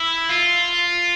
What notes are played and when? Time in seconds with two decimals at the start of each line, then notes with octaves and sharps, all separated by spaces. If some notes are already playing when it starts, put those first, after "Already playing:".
Already playing: E4
0.29 F4